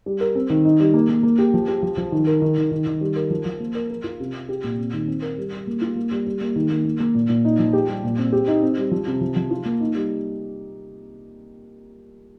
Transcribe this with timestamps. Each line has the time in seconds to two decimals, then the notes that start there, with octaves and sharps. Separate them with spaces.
0.06 G3
0.21 A#4
0.35 C4
0.50 D#3
0.65 D#4
0.80 G3
0.94 A#3
1.09 A#3
1.23 A#3
1.39 G4
1.54 F3
1.68 G4
1.82 F3
1.97 F3
2.12 D#3
2.27 A#4
2.42 D#3
2.57 D#3
2.71 D#3
2.87 D#3
3.01 G3
3.16 A#4
3.30 F3
3.45 F3
3.60 A#3
3.75 A#4
3.90 A#4
4.04 F4
4.20 C3
4.34 C3
4.49 G4
4.64 A#2
4.78 C4
4.93 D#3
5.07 C4
5.22 A#4
5.38 G3
5.53 G3
5.67 A#3
5.82 F4
5.96 A#3
6.11 G3
6.27 G3
6.41 A#3
6.56 D#3
6.70 A#3
6.85 A#3
7.00 A#3
7.14 A#2
7.29 A#2
7.45 D#4
7.59 F3
7.73 G4
7.88 G3
8.04 A#2
8.18 C4
8.33 G4
8.48 D#4
8.62 C4
8.78 G3
8.91 F3
9.07 C3
9.21 F3
9.36 F3
9.51 F4
9.65 A#3
9.80 D#4
9.95 G3